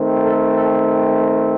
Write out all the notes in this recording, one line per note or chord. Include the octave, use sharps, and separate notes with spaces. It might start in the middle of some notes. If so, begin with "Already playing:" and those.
Already playing: D#3 A3 C4
A4
A4